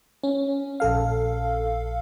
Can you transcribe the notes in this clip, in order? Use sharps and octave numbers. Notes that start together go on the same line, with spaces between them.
C#4
A#1 A4 F5